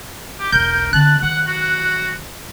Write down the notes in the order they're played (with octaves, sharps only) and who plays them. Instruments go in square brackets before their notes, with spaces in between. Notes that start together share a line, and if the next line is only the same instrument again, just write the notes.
[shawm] G4
[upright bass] E1 B1 [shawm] A#4 [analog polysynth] G6
[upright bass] D3 C4 [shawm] A5 [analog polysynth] F#6
[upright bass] D#3 F#3 [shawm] F#5
[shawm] F#4